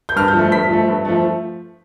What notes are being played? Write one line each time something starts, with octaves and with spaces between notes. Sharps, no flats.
G6
G2 F6
G6
F3 A3
G2 B6
F3 A3
G2
F3 A3